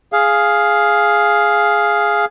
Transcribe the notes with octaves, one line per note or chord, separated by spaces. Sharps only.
G#4 F5